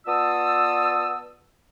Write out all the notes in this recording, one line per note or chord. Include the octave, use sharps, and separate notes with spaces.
B3 F4 D5 A5 D#6 E6